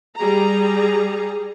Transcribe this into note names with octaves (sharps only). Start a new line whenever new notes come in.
G3 G#4 A#5